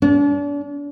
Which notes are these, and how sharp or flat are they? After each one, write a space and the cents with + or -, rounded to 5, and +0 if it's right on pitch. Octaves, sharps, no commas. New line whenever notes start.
D4 -40